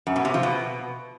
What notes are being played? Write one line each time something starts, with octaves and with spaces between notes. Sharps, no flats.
F#2
B2
C3
F3
B2